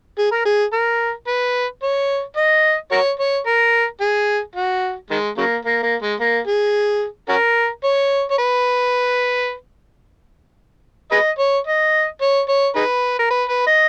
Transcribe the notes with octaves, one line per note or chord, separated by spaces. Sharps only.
G#4
A#4
G#4
A#4
B4
C#5
D#5
F#4 A#4 C#5
C#5
A#4
G#4
F#4
D#3 G#3
C#3 F#3 A#3
A#3
A#3
G#3
A#3
G#4
C#4 F#4 A#4
C#5
C#5
B4
G#4 B4 D#5
C#5
D#5
C#5
C#5
D#4 G#4 B4
A#4
B4
B4
D#5